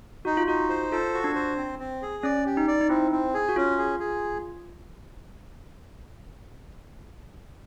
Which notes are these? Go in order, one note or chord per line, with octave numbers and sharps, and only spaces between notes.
D#4 F#4
F4
D#4 F#4
C5
F4 A4
F#4
D4
C5
C4
C4
G#4
C#4 D5
G4
D#4
D5
D#4
C4 E4
C4
G#4
F#4
C#4 F4
G#4
G#4